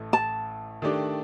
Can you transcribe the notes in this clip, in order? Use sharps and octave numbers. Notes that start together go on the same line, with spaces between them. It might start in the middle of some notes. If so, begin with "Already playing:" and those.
Already playing: A1 A2 A3
A5
D#3 A3 D4 G4 D5